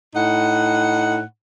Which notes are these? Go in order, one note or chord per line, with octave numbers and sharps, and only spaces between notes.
A2 D#4 F#5